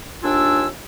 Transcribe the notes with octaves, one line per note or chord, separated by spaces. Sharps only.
D#2 D4 F4 G#5 E6